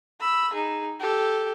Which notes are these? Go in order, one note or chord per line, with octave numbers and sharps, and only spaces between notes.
B5 E6
D#4 G#4
G4 A4